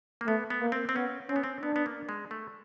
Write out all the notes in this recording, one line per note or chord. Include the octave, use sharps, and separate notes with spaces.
A#3
A3 B3
B3
A#3
C4
C4
B3 C#4
C4 C#4
B3
C4
B3 D4
B3
A#3
G#3
A3